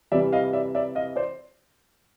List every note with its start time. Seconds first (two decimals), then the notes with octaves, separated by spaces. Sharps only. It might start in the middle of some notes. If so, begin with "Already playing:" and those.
0.12 C3 E3 G3 D5 E5
0.33 D#5 F5
0.53 D5 E5
0.75 D5 E5
0.95 D#5 F5
1.16 C5 D5